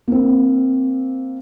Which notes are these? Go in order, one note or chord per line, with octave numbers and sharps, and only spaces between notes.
A#3 C4